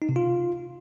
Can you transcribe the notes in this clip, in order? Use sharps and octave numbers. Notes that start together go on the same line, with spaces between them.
D#4
C3
F4